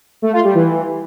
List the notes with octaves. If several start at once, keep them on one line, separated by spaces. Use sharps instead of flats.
A3
F4
G3
E3